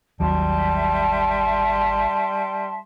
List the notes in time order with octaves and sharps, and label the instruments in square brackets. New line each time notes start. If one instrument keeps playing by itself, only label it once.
[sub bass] G#1 [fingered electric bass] D#2 F#3 [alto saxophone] G3 [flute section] E5 A5 C6